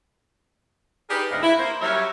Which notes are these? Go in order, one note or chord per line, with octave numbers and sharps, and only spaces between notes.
D#4 G4 G#4 A#4 B4 D5
D2 G#2 C3 B4 D#5 F5
E4
A#3 C5
F#3 G3 C#4 A#4 C#5 E5